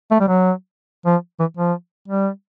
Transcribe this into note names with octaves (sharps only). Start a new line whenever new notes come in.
A3
G3
F#3
F3
E3
F3
G3